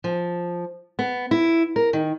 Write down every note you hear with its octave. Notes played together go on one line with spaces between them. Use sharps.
F3
B3
E4
A#4
D#3